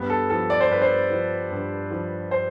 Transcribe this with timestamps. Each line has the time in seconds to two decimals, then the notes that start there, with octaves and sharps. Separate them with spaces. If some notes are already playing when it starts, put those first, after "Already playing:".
Already playing: G2 B3
0.10 A4
0.30 F3 A4
0.50 D5
0.61 C5
0.70 G2 B4
0.82 C5
1.10 F3
1.51 G2
1.91 F3
2.31 C5